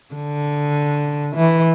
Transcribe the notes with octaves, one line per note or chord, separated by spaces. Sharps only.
D3
E3